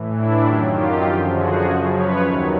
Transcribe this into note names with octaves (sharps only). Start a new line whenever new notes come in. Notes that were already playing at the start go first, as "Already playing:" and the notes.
Already playing: A2 E3
D4 E4
F#2 D#3 F#3 F4 G4
F4 G4
F#2 D3 F3
F#4 G#4
F#2 C#3 F3
B4 C#5
D#2 D#3 F#3